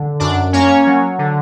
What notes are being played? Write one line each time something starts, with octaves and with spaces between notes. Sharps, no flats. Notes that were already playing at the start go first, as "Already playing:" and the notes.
Already playing: D3
F#2 D4 D5
A#3 C#4 C#5
F#3
D3